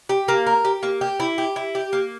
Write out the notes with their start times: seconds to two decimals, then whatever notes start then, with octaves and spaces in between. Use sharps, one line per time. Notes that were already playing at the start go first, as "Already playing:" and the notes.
0.09 G4
0.28 A#3
0.46 A#4
0.65 G4
0.83 A#3
1.01 G4
1.20 E4
1.38 G4
1.56 E4
1.75 G4
1.93 A#3